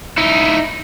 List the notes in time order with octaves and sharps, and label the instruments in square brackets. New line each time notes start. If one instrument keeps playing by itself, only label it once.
[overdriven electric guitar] D#4 E4